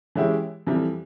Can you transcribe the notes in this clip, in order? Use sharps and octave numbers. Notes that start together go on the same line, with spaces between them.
E3 G#3 C#4 E4 G4
F2 E3 G3